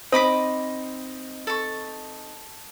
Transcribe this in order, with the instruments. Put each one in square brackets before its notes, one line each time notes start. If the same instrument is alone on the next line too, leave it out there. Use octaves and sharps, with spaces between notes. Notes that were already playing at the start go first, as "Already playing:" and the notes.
[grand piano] C4 D#4 A#6 [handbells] C5 B6 [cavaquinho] D#5 B5 D6
[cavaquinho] A4 C#6